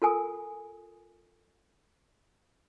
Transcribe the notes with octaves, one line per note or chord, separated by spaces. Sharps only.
F4 A4 A#4 G#5 D#6